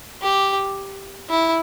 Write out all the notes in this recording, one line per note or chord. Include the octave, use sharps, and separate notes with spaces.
G4
E4